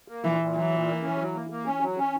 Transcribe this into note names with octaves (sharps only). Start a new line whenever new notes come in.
A#3
A#2 E3
A#2
E3 F#3
A#2
A#3
C#4
F#3
A#3
A#3
C#4
F#3
C#4